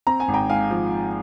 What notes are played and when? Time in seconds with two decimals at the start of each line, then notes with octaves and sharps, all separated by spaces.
0.07 C4 A#5
0.20 G#5
0.28 G#1
0.34 G5 A#5
0.49 G#2 F5 G#5
0.71 F3